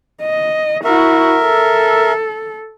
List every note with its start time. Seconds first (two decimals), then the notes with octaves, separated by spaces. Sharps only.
0.22 D#5
0.84 E4 F#4 A#4 E5
1.42 A4